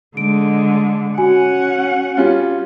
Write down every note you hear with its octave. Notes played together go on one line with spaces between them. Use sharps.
D3 G#3 D7
C#4 F#4 F#5 G#5
G3 C#4 F4